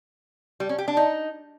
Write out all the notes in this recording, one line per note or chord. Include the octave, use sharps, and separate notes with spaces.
G3
C#4
G4
D4
D#4